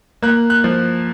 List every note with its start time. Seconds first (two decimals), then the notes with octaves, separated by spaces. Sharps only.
0.22 A#3 F#6
0.50 F#6
0.64 F3